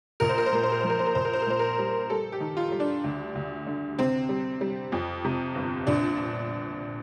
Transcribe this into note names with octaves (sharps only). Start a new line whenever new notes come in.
A#1 A#4
C5
A#4
C5
A#2 A#4
C5
A#4
F3 C5
A#4
C5
A#4
A#1 C5
A#4
C5
A#4
A#2 C5
A#4
G3
G3 A4
G4
D#3
F4
G3
D4
D2
D2
D3
C3 C4
G3
G3
F2
C3
G1
A#1 D4